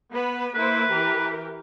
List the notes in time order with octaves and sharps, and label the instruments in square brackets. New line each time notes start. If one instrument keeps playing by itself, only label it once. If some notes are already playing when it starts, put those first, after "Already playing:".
[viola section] B3 B4
[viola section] A#3 E4 C5 [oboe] B4
[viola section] E3 G4 A#4